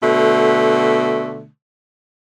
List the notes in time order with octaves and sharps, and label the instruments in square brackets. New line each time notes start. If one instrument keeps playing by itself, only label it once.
[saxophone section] B2 D3 A3